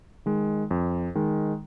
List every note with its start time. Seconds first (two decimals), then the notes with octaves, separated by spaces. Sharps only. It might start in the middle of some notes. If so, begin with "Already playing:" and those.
0.26 D#3 G#3
0.71 F2
1.15 D#3 G#3